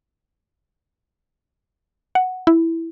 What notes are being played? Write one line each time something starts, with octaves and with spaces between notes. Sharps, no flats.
F#5
E4